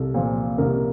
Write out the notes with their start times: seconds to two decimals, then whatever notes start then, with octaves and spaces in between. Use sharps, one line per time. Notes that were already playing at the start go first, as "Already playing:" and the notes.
Already playing: C2 A4
0.14 A#2 F3
0.58 C2 A#4